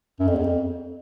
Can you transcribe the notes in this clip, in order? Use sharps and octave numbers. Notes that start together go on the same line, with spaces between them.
F#2
F2
E2
F2